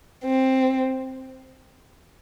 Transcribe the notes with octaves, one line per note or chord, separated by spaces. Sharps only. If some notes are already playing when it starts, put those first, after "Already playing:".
C4